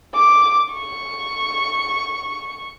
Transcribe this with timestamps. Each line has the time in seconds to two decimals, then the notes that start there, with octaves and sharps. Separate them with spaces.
0.14 D6
0.73 C#6